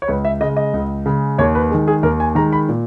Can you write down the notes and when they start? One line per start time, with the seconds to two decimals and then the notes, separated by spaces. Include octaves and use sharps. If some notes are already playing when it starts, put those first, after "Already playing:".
0.02 C#5
0.08 C#2 B4
0.25 E5
0.40 C#3 G#3 D#5
0.57 D#5
0.74 C#2
1.06 C#3 G#3
1.39 D#2 C#5
1.55 B4
1.70 D#3 G#3
1.88 G#4
2.03 D#2 A#4
2.20 G#5
2.35 D#3 G#3 A#5
2.53 B5
2.69 A#2